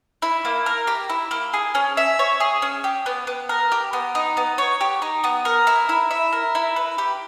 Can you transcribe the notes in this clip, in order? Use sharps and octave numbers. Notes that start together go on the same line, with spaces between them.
E4
A#3
A#4
G4
E4
A#3
G#4
C#4
E5
C#5
G#4
C#4
G4
B3
B3
A#4
G4
B3
D#4
B3
C#5
G4
D#4
B3
A#4
E4
E4
E5
A#4
E4
B4
G4